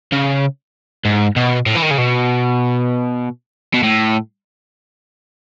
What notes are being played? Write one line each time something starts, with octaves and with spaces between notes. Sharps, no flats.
C#3
G#2
B2
A2
E3
D#3
C#3
B2
B2
A2